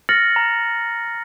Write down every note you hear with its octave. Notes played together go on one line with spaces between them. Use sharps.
F6 A6 A#6 C#7 F#7
A#5